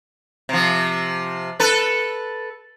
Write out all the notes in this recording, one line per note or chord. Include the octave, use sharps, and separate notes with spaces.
C3 F3
A4 B4